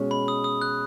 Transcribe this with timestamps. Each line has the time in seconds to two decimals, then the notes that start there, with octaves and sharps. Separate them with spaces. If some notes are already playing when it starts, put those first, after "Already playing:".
Already playing: B2 G#3 C#4 G#4 C#5
0.11 B5
0.28 D#6
0.44 D#6
0.62 F#6